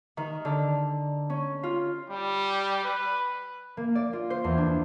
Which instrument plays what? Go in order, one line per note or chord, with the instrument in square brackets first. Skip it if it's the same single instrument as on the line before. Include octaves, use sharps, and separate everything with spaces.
[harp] D#3
D3
C#4
F4
[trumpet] G3
B4
[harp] A#3
D5
F4
C5
E2
D4